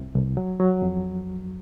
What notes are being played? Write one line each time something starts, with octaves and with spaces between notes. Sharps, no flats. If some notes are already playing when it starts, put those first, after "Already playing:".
Already playing: C2 C3
C2
F#3
F#3
F2